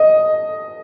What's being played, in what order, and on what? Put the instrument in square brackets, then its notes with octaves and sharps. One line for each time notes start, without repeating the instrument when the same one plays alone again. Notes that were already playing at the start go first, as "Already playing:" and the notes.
Already playing: [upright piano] D#5